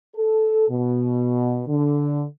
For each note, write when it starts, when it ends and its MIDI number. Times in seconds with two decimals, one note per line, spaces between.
0.16 0.67 69
0.69 1.63 47
1.68 2.24 50